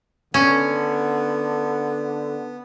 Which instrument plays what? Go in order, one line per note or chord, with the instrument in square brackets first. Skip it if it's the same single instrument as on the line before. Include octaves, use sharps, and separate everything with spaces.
[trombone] D3 [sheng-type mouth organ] B3 [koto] C#4